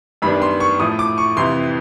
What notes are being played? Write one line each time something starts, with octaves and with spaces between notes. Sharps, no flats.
F#2 D#3 G3 B3 D4 B5
C6
C#6
A2 F3 A3 D#6
D6
C#6
F2 C3 E3 C6